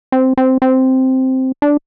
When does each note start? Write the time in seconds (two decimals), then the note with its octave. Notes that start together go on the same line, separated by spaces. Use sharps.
0.12 C4
0.37 C4
0.62 C4
1.62 D4